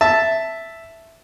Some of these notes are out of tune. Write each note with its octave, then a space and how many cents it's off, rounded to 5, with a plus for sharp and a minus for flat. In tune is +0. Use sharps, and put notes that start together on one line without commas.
E5 +0 A5 +0